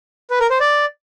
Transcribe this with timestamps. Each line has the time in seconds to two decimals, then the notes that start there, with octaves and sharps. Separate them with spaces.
0.30 B4
0.40 A#4
0.50 C5
0.60 D5